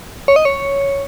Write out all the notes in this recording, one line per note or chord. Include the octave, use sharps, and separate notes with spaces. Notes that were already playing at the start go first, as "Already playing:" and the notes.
C#5
D#5
C#5